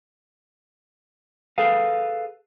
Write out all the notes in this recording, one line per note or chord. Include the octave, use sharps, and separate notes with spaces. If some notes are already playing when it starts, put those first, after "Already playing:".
G#4 A4 B4 F5